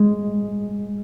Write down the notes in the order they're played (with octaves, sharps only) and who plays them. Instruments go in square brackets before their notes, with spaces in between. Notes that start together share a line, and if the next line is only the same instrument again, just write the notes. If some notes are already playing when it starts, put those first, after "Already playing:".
Already playing: [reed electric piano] G#3